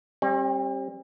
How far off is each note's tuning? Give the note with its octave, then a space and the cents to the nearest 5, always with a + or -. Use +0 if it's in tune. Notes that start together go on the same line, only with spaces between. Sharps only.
G3 +0 C4 +40